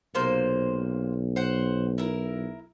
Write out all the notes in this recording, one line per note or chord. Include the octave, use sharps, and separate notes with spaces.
B1 C3 A#3 C5
C5 F#5
E4 A#4